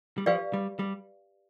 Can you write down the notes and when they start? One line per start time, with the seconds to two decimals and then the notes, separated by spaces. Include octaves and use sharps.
0.18 G3
0.26 F3 G4 B4 D5 F5
0.53 G3
0.79 G3